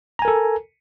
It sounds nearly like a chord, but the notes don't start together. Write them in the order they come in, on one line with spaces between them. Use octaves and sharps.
A#5 G#5 A#4 A4